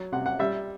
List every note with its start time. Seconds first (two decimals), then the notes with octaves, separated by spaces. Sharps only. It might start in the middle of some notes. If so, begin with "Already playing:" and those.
Already playing: F#3
0.12 C3 F#5
0.26 F#5
0.39 G3 E5